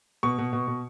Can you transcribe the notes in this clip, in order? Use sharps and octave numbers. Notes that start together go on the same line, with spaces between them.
B2 C#6
B2
B2
B2